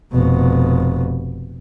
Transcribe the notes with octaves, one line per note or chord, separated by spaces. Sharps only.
F1 B2